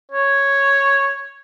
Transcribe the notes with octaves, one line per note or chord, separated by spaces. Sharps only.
C#5